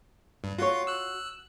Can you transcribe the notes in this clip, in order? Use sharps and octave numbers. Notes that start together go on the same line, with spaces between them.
G2
F4 F#4 C#5 C6
E6 F#6